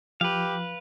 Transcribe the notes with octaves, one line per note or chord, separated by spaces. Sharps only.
F3 G4 B4 F5